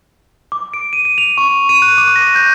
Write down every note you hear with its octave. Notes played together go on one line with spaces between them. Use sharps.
D6
D7
D#7
D#7
F7
C#6
D#7
F#6
D6
A#6
G6